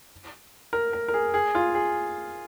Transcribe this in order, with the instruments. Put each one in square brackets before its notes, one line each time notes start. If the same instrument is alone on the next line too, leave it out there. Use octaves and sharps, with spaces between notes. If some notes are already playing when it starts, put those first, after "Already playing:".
[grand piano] A#4
A#4
A#4
G#4
G#4
F4
G#4